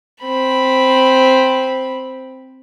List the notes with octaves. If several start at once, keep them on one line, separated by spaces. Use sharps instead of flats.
C4 B5